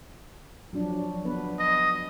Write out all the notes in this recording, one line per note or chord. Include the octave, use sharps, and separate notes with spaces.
F3 F#3 D4
B3 D4 B4
D#5